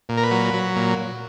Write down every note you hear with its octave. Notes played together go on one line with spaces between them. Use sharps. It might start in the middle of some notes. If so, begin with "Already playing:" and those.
A#2
A#4
B4
F#3
F#3
A#2